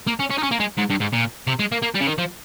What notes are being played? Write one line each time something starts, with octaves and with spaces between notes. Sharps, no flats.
A#3
C#4
C#4
D#4
C#4
A#3
G#3
G#2
G2
G#2
A#2
C3
G#3
A#3
A#3
G3
C#3
D#3
F3